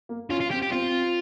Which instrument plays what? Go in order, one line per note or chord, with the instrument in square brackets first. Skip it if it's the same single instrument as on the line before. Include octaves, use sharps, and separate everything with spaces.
[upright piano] A#3
[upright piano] C#4 [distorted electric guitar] F4
[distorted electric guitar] F4
[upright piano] C4 [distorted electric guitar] G4
[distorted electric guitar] G4
[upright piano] C4 [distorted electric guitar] F4